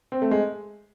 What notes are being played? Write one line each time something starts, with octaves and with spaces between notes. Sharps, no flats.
C4
A3
G#3